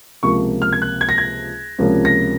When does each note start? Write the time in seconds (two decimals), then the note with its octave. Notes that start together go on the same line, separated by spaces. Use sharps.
0.23 C#2 C3 F3 A#3 C#6
0.62 F6
0.73 G#6
0.82 F#6
1.01 G#6
1.09 A#6
1.18 G#6
1.79 C#2 C3 F3 A#3 C#4
2.05 A#6